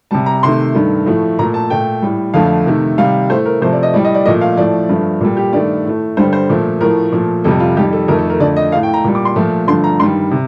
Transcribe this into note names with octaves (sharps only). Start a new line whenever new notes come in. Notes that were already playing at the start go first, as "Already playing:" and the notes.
C3 G3 A5
A#5
C3 D#3 A3 C6
G2 D#3 A3
A2 F3 A3
A#2 A3 A#5
A5
A#2 A3 G5
A2 G3
F2 D3 F3 A3 F5
C3 D#3 A3
C3 D#3 G3 F5
A2 A3 C5
A#4
C3 F3 A3 C5
D5
D#5
A2 G3 D5
D#5
D5
A#2 F3 A3 D#5
F5
A2 F3 A3 D5
G2 F3 A3
A#2 G3 A4
G4
G2 D#3 A3 D5
A2 A3
G2 D3 G3 C5
C5
A#2 F3 A3
A2 F3 A3 A#4
A#2 F3 A3
F2 C3 G3 A4
F4
F2 D#3 G3 G4
A4
F2 D#3 A3 A#4
A4
A#4
F2 D3 A3 D5
D#5
A2 A3 F5
G5
A#5
A#2 G3
D6
C6
A#2 F3 A3
G2 D3 F3 A3 C6
A#5
G2 D#3 G3 C6
C3